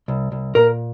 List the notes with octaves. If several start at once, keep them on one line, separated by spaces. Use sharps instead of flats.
C2
C2
A#2 A#4